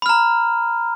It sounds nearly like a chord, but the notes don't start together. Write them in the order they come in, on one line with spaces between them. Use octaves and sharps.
B5 F6 A#5